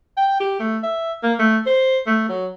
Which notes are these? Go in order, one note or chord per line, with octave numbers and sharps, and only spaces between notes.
G5
G4
A3
E5
A#3
A3
C5
A3
F#3